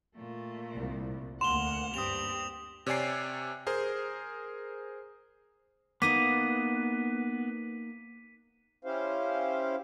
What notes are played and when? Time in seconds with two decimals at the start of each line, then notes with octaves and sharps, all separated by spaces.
0.16 A#2 A3
0.74 C2
1.41 D2 A#3 F#5 C6 E7 F7 G7
1.94 G2 C4 G4 D#6 F7
2.86 C3 C#5 D5 G#5 C7
3.67 G#4 A#4 C5
6.02 A#3 B3 D#4 D#5 D6 B6 D#7
8.85 C#4 E4 G4 C5 F5